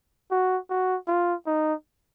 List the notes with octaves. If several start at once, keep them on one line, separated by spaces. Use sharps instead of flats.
F#4
F#4
F4
D#4